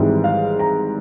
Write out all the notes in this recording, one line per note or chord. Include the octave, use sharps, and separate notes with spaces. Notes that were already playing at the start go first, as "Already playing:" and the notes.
Already playing: G#1 G#2 E3 G3
F5
A#5